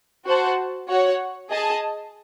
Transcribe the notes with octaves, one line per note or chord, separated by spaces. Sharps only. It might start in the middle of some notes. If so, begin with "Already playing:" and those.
F#4 C5 F#5 A5
F#4 C#5 F#5
G#4 D#5 A5